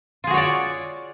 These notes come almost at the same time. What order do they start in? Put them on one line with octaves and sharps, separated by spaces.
F4 G#4 F#4 C#5 D5